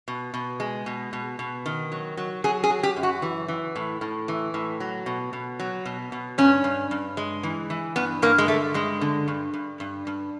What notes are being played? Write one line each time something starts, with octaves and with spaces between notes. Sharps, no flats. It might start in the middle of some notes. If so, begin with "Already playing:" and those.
B2
B2
G#3
B2
B2
B2
D#3
F#3
F#3
F#3 G#4
G#4
F#3
G4
F#2
F#4
E3
E3
A2
A2
E3
A2
F#3
B2
B2
F#3
B2
B2
G2 C#4
G2
G2
G#3
E3
E3
G2 B3
G2 A#3
G#3
D3 A3
G2 G#3
D3
G2
G2
G2
G2